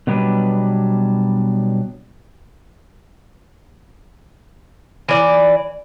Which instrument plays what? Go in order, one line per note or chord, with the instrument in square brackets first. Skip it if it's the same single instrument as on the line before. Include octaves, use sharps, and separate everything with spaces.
[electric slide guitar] B2 F#3 G3 B3 D4 B4
[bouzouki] E3 D5